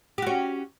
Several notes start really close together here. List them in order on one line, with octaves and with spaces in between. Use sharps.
G4 F#4 C#4